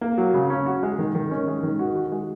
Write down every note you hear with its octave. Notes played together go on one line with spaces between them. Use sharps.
A#3
F#3
C#3
C#4
F#4
G#3
D#3
D#3
C#4
G#3
D#3
F#4
F#4
G#3